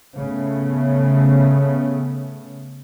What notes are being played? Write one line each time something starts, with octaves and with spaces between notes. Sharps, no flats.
C#3 A3 B3